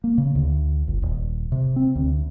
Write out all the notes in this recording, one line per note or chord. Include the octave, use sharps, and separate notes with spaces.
A#3
C#3
D2
G1
D#1
C3
C4
D2